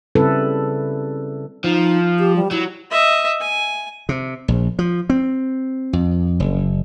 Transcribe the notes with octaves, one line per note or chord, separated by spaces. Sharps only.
C#3 G3 C4 E4 A4 B4
F3 D#4
G4
G3
F#3 E4
D#5 E5
G#5
C3
A#1
F3
C4
F2
F#1